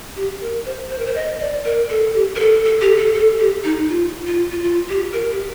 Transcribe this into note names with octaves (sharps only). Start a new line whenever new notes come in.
G4
A#4
C5
C5
A#4
C5
D#5
D5
A#4
A4
G4
A#4
A4
A4
G4
A4
A4
G4
D#4
F4
F4
F4
F4
G4
A#4
G4